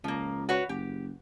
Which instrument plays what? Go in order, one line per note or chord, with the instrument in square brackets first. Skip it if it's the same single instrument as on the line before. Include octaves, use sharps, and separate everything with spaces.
[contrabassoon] C#2 [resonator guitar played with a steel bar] F3 A#3
[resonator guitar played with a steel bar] F#4 B4 C#5
[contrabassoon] F#1 [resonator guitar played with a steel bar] G4